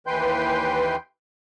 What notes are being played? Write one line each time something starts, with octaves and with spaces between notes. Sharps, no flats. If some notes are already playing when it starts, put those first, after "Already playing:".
D#2 E3 B4 G5 C6 G6